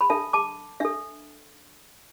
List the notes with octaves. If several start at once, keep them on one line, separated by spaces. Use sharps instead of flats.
B5
D4 A4 E5 A5
A5 D6
D4 A4 E5